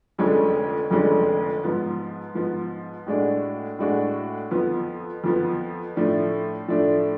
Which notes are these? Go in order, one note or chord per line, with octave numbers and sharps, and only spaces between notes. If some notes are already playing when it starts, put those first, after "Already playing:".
F1 F2 D3 G#3 C#4
F1 F2 D3 G#3 C#4
G#2 F3 B3
G#2 F3 B3
A2 G#3 D4 F#4
A2 G#3 D4 F#4
F2 F3 B3
F2 F3 B3
A2 F3 A3 D4
A2 F3 A3 D4